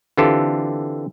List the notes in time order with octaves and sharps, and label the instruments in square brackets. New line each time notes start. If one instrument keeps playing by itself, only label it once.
[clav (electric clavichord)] D3 E3 C4 F4 G4 A4